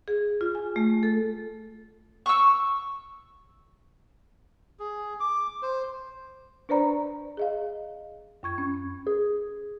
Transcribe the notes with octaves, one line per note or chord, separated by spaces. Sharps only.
G#4
F4
G#5
A3
A4
C#6 E6
G#4
D6
C5
D4 B4 C5 D5 A#5 B5
G#4 D#5 F5
F#2 C#6 G#6
C#4
G#4